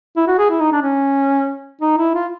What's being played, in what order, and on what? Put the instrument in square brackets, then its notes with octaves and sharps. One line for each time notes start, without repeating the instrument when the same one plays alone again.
[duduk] E4
F#4
G#4
E4
D#4
D4
C#4
D#4
E4
F4